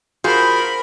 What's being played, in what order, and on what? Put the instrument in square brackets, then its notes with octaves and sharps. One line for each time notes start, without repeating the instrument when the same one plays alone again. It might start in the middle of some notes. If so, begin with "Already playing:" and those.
[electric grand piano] F4 F#4 G#4 [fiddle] A#4 B5 [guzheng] C5